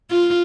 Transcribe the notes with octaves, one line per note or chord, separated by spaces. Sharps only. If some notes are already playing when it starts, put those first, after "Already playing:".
F4